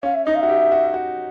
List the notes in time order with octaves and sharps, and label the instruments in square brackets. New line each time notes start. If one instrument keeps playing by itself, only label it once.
[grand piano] C#4 [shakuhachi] F5
[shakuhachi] E5
[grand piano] D#4 [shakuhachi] D#5
[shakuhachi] F5
[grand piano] F#4 [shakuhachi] E5
[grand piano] G4
F#4
F#4